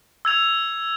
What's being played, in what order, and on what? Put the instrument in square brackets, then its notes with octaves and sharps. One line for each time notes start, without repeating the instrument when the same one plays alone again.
[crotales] E6 G#6 F7